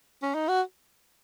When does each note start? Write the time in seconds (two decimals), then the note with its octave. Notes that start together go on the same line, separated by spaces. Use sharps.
0.23 C#4
0.35 D#4
0.49 F#4